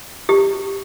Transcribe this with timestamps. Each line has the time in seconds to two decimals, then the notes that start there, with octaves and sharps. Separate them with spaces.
0.29 G4